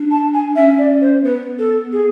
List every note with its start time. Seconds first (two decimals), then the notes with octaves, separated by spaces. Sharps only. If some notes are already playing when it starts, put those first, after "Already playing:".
Already playing: D4
0.11 A5
0.34 G#5
0.56 C#4 E5
0.78 D5
1.01 C5
1.24 B3 B4
1.59 A4
1.92 G#4